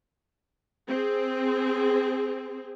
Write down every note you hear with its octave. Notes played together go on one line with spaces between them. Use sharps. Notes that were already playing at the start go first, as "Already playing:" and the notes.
C4 G#4